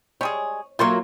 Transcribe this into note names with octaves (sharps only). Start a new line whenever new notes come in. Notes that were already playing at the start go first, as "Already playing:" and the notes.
G3 G#3 G#4 C#5
F#3 A3 A#3 F4 C6 C#6